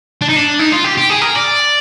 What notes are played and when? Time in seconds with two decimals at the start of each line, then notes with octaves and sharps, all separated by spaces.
0.21 D4
0.29 D#4
0.36 D4
0.59 D#4
0.72 F4
0.84 G4
0.97 G4
1.10 G#4
1.21 A#4
1.35 D5